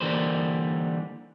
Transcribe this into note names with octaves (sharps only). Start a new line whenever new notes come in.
D3 E3 G3 A#3 B4 C5